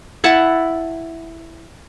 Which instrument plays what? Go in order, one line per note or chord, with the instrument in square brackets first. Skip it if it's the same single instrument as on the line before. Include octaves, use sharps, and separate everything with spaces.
[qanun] E4 F#5 A5